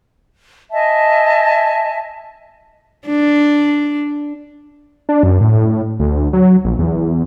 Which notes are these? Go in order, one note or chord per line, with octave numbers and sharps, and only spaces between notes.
D#5 E5 G#5 A5
D4
D4
F#2
A2
D2
F#3
A#1
E2